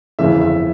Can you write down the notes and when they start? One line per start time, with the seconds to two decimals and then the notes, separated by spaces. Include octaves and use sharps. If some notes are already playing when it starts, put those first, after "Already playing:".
0.19 G1 F2 C#3 E3 E5
0.41 E5